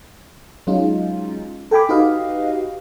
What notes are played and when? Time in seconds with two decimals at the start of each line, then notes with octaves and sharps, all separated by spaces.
0.67 F#3 G#3 C#4 D#4 F4
1.71 A4 G5 G#5 B5 D6
1.89 D#4 F#4 G4 B4 D#5 F5